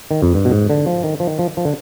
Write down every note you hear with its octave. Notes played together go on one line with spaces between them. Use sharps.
D#3
F2
G2
B2
G#2
D3
F3
D#3
F3
D#3
F3
F3
D3